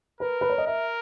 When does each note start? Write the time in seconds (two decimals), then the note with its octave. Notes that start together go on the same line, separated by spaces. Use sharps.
0.20 A#4 B4
0.41 B4
0.50 C#5
0.58 D#5
0.66 A#4 E5